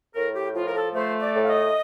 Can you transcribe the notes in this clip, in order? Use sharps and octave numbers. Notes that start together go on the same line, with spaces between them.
A2 A#4
G4
F3 F4
A#4
A4
A3 C5
D5
A2
F5
D#5